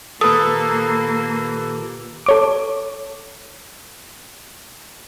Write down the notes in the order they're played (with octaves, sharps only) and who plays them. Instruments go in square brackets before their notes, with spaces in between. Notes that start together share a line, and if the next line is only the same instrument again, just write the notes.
[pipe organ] A#2 D#3 G4 [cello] A#3 [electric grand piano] A4 B4 [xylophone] D#6
[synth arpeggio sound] A4 C#5 D6